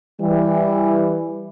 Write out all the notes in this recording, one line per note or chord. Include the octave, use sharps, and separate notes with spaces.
E3 G3